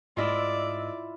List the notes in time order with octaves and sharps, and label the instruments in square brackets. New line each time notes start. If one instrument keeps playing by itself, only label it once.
[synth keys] G#2 D#5 E6 [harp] E4 F4 [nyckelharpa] D5